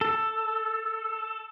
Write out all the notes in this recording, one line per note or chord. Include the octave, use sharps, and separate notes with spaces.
A4